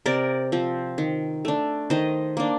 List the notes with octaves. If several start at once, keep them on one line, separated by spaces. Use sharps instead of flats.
C3 A#4 D5
F3 C4
D#3
A3 D4
D#3 C5 D#5
A#3 D4